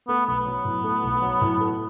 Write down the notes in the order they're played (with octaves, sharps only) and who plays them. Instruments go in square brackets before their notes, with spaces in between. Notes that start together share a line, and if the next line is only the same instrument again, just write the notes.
[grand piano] A3 [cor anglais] B3
[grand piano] B1 [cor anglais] B3
[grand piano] F#3
A2
A3
B1
F#3
A2
A3